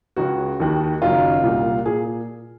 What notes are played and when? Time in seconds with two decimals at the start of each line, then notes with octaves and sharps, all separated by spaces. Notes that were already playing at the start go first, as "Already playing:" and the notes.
0.16 C#2 C#3 F#4
0.60 D#2 D#3
1.02 F#1 F#2 D#3 F4
1.43 C2 A#2
1.86 A#2 G#4